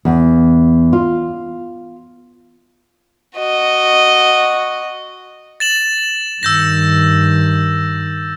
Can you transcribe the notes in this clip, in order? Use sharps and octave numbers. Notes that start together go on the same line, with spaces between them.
E2
F4
F#4 D#5
A6 E7 F#7
G2 D#3 E6 G6 A#6